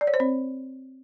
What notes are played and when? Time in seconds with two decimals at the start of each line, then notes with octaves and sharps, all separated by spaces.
0.01 D5
0.07 C#5
0.14 C5
0.20 C4